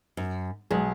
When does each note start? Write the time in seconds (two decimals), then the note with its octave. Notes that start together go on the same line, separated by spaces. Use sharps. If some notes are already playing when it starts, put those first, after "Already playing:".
0.17 F#2
0.71 B1 G#3 G#4